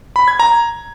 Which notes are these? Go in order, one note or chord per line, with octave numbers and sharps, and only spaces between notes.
B5
G#6
A#5